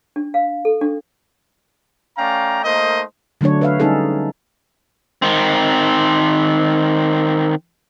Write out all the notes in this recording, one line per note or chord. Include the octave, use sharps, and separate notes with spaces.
D4
F5
A4
D4
A3 C#4 D5 F5 G5 A#5
A3 A#3 D#4 A#4 C5 D#5
D3 F#3 A3 D4 C#5
B4 E5 F5
G3 C#4 D#4 G#4 A4
D#3 C4